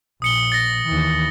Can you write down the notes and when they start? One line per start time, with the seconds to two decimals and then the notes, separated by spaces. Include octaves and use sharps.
0.22 A#1 D#6 C#7 G7
0.52 A6 A#6
0.88 D#2 E3